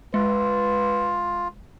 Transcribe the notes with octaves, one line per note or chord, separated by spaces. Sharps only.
G#3 F4 B4